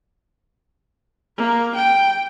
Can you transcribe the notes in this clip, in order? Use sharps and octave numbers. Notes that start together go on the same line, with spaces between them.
A#3
G5